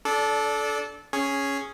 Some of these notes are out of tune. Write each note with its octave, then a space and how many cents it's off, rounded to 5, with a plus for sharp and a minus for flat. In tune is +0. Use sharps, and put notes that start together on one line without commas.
D4 -20 A4 -20 D5 +0
C#4 +0 G#4 +0 C#5 +0